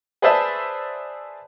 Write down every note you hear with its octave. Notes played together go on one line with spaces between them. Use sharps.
G#4 B4 C5 D5 E5 A5